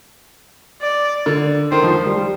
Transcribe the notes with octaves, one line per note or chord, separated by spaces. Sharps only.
D5
D3
D#3 C5
F3
F3
G3
G3